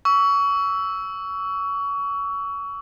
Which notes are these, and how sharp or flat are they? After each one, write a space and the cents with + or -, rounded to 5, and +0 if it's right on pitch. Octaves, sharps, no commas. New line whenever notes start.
C#6 +30 E6 +0